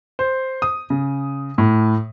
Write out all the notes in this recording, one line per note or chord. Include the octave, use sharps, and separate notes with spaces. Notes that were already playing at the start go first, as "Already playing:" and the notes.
C5
D#6
C#3
A2